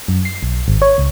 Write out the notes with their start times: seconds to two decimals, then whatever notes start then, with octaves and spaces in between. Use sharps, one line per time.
0.08 F#2
0.25 C7
0.43 B1
0.68 G#1
0.82 C#5
0.98 C#2